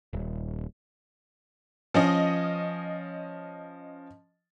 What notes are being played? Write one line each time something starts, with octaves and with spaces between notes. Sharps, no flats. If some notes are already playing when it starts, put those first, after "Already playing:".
D#1
F3 C#4 D#5